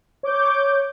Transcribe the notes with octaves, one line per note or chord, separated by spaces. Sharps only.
C#5 D6 G6